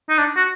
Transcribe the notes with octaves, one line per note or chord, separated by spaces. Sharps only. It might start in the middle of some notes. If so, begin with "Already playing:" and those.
D#4
D4
F#4